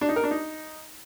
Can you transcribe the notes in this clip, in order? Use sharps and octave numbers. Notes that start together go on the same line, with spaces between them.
D4
D#4
A#4
D4
D#4